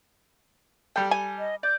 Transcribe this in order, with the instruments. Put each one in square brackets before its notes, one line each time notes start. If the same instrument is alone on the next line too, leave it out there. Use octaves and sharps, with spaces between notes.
[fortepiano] G3 G4 A4 [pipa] G5
[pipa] G#5
[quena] D#5
[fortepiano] D5 [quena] G6